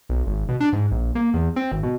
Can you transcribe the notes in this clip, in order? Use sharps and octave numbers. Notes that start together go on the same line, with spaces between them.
B1
G#1
B2
D4
G#2
A#1
A#3
E2
C4
G#1
B2